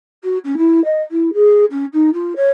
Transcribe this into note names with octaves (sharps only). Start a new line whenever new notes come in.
F#4
C#4
E4
D#5
E4
G#4
C#4
D#4
F4
C#5